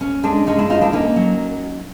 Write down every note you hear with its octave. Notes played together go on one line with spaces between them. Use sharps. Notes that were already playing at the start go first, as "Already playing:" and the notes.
C#4
G#3 D4
G#3 C#4 D#4
D4 E4
C#4 D#4 F4
D4 E4
A#3 C#4 D#4
F#3